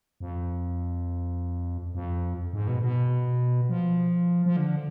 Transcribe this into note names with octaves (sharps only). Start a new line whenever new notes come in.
F2
F2
G#2
B2
B2
F3
F3
D3